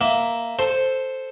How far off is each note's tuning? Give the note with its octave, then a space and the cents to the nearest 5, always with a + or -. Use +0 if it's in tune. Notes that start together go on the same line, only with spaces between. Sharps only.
A#3 +0 E5 +0
A4 +0 C5 +0